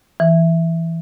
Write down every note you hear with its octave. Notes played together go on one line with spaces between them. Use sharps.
E3